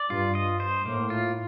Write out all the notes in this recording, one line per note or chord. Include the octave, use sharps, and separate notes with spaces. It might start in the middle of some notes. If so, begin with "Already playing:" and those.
Already playing: D5
G2 F4
D#5
C5
A2 A#3
F4